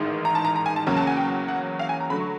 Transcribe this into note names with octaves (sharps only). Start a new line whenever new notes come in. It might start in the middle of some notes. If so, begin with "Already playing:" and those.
Already playing: A1 G#2 D#3 G#3
A#5
A5
A#5
A#5
G#5
A5
E2 C#3 F#3 A#3 C#4 A#5
A5
G#5
G5
F#5
F5
G#5
A#5
D3 F#3 A3 B5
C#6